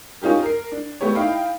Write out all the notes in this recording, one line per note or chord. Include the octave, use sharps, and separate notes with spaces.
C#4 D#4 F4 G4 A#4
A#4 C7
D4
A3 B3 G4 C#5
D#4 E4 F5 G5 B5